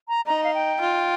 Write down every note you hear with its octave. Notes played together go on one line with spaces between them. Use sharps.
A#5
D#4 A#5
F5
G5
F4